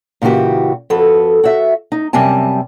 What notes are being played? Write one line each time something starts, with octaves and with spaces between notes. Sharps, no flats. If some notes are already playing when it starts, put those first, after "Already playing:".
A#2 C#3 E3 F#4 G4
F2 F#4 A4 B4
F#4 E5
D#4
F#2 C3 G3 C4 G#5 A5